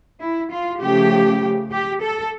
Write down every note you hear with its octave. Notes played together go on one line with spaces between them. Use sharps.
E4
F4
C#3 F3 A3 G4
G4
A4